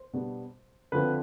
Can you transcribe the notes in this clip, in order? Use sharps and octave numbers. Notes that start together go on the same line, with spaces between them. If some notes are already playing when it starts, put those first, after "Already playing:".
Already playing: C5
B2 G3 B3 D4
D3 F3 C4 B4